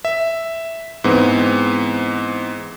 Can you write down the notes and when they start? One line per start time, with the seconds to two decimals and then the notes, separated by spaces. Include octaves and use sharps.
0.05 E5
1.04 G#2 E3 B3 C4